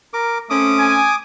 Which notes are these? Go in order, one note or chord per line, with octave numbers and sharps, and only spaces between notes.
A#4 D6
A3 C4 C#4 D6 D#6
G#5